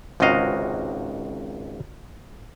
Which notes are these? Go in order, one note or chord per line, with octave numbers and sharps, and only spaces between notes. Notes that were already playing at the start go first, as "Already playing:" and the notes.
G#1 C#2 C3 F#4 D#5 F5